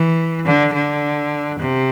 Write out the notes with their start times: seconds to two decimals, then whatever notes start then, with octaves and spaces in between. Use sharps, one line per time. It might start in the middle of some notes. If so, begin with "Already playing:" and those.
Already playing: E3
0.45 D3
0.74 D3
1.59 C3